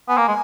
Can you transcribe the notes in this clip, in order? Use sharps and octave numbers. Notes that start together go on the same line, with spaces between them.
B3 G#5
A#3
G#3